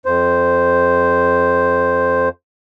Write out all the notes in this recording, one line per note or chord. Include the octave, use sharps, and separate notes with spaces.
F2 C5